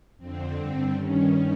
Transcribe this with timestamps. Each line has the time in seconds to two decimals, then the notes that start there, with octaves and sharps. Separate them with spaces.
0.18 F2 D3 C4
0.56 G2 D3
0.93 G2 D#3 C#4